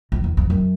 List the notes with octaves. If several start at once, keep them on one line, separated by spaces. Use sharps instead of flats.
F2
E2
F2
F#2